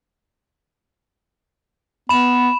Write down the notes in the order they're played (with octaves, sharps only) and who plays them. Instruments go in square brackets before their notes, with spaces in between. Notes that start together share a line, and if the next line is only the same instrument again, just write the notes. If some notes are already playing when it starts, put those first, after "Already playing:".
[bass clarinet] B3 [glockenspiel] B5 E7